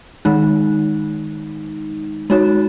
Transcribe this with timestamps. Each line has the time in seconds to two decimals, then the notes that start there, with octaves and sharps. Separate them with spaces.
0.25 D#3 G#3 D#4
2.30 G#3 D#4 F#4 C#5